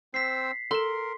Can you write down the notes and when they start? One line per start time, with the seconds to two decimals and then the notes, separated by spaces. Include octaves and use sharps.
0.14 C4 C5 E6 B6 C7
0.71 A4 A#4 C6 E7